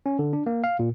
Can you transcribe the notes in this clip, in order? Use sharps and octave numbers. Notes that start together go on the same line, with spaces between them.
C#4
D3
D4
A#3
F5
A#2